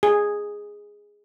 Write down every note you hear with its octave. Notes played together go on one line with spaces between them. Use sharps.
G#4